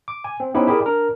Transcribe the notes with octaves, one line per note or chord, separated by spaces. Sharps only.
D6
G#5
C4
B3 C#4 D#4 E4 G4 C5
E4 G4 G#4 A#4 D5
D4 A#4